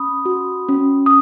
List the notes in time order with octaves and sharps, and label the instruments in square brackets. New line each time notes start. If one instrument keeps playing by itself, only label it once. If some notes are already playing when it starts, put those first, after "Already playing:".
Already playing: [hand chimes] C#4 B5 D#6
F#4
C#4
D#6